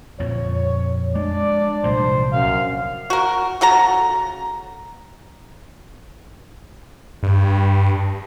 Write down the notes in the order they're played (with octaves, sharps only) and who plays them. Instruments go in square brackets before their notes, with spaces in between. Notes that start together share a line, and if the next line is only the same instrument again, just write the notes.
[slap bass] F2 A#2 F3 [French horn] C#5
[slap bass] G#3 [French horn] D4 [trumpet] D5
[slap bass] C2 A#2 F3 [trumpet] C5
[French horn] F#2 [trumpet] F5
[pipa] F#4 A#4
C#3 F#4 A4 A#5
[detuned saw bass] G2